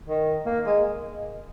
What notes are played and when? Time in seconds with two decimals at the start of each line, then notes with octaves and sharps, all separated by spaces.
0.09 D#3
0.46 A#3
0.66 G#3